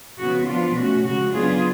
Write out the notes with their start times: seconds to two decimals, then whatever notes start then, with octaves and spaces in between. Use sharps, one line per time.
0.19 C#3 F3 B3 F#4
0.47 F3 B3 D4 F4
0.76 B2 A3 C#4 F#4
1.04 C#3 F3 G#3 F#4
1.33 C#3 F#3 B3 D4 F4 G#4